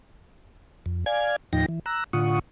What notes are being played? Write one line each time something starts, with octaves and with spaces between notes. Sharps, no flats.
F2
D5 F5 G#5 G#6
D#2 A2 F3 D#4 G5 A#6
E3
A#5 E6 F#6
A2 D3 F4 F#5 C#6 D#6